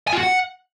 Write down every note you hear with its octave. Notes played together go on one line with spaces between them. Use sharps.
G#5
F4
F#4
F#5